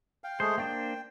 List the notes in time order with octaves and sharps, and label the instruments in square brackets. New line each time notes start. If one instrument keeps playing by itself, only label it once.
[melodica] F5 G5
[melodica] G#3 A3 G#4 [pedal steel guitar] C5
[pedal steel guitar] A#3 D4 C5 [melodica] G5